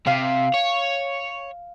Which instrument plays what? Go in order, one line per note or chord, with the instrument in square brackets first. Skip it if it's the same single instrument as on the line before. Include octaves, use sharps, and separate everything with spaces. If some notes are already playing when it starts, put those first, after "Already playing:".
[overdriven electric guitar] C3 [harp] F5
[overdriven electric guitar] C#5